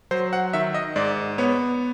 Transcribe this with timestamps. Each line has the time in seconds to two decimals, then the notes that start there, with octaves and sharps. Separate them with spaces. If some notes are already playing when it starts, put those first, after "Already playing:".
0.11 F#3 C5
0.33 F#5
0.53 D#3 E5
0.74 D#5
0.96 G#2 D5
1.38 B3 C#5